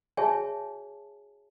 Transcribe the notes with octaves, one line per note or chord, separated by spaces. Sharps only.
F#4 G#4 C#5 E5 G#5 A5